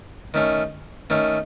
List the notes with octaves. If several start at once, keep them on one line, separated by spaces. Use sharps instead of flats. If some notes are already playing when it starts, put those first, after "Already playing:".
D#3 A3 C#4
D#3 A3 C#4